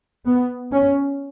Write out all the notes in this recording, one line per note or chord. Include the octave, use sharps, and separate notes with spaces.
B3
C#4